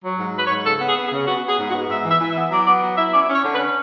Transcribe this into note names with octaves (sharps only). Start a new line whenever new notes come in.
F#3
G#2
F#3 B4
C#5
G#2
C#3 A4
B3
G#4
B3
G#4
C#3
B3 F#4
B3
G#4
G#2
F#4
B3
G#2 E5
E3
E5
E3
E5
B3
F#3 D5
B3 D5
F#3
E4 E5
C#4 D5
C#4
C#5
D3
B4
C#4